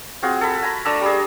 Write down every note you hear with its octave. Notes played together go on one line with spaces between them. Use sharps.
C4 F4 F#4 G#4
A4 B5
G#5 A#5 B5
A3 D4 A#5 E6
G3 G#4